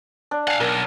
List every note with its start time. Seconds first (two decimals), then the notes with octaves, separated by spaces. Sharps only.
0.31 D4
0.47 F5 F#5 G#5 A5
0.60 B1 A#4 F#5